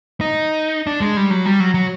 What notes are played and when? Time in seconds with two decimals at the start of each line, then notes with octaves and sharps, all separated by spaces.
0.21 D#4
0.87 D4
1.01 G#3
1.17 G3
1.31 F#3
1.46 G3
1.60 F#3
1.74 F#3